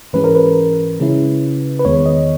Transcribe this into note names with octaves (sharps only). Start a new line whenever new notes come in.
G#2 E3 G#3 C#4 B4
A#4
B4
C#3 G#3 C#4 E4
B4
E2 D#3 G#3 B3 C#5
D#5